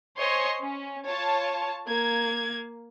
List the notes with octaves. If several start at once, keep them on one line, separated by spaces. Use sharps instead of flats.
C5 C#5 D#5 G#5 C6 C#6
C#4
F4 C#5 A5
A#3 G#6